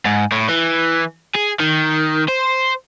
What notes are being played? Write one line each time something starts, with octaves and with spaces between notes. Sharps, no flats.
G#2
A2
E3
G#4
D#3
C5